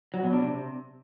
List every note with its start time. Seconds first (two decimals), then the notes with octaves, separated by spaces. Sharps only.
0.14 F#3
0.23 B2
0.33 D4
0.42 C3